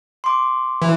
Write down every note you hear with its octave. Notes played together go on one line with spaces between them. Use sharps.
C6 D6
E3